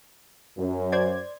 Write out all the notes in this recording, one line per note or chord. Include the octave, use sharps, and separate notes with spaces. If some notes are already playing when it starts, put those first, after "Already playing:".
F#2
C5 D5 G#6